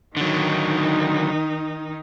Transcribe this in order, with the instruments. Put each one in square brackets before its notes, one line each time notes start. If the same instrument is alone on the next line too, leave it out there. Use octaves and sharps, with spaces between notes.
[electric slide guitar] D3 F#3 [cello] D#3 D#4